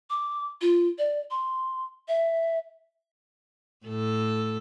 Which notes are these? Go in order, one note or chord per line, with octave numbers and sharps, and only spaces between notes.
D6
F4
D5
C6
E5
A2 A4